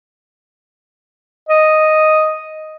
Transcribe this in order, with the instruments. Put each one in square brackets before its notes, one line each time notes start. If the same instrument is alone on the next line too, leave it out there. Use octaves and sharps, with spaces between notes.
[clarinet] D#5